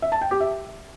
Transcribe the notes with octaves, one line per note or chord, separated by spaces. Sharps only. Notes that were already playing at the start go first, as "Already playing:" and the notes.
E5
A5
G5
G4
E5